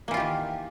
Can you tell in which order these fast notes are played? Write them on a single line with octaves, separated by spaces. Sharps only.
A#3 E3 F4 G4 D#3